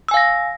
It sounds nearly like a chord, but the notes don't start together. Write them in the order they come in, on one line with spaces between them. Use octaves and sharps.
E6 G#5 F5 A#6